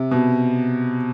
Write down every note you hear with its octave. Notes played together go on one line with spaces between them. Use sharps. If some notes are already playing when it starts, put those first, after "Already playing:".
Already playing: C3
B2